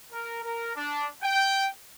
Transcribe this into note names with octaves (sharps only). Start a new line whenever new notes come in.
A#4
A#4
D4
G5